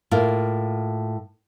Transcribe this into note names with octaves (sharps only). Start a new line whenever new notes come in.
A2 A#3 F4